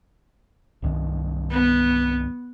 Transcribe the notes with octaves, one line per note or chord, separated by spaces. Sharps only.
C2 G2 D#3
B3